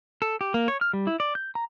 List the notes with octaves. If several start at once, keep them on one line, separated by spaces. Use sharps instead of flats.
A4
G4
A#3
C#5
F6
G3
E4
D5
G6
A#5